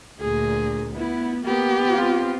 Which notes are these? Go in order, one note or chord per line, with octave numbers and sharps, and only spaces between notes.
D2 A#2 G#4
B3 E4
A#3 B3 G4
C4 F4